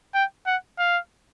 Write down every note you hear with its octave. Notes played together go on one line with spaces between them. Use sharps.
G5
F#5
F5